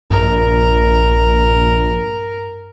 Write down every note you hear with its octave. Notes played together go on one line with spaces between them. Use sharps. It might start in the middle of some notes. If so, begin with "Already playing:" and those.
A#1 G2 A#4